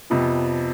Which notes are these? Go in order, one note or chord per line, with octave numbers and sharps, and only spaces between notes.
F2 C3 F3 B3